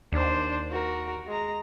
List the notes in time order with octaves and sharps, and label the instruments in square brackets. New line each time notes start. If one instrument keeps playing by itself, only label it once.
[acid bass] D#2 [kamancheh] D4 C5
[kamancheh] F#4 A#4
G#3 A#5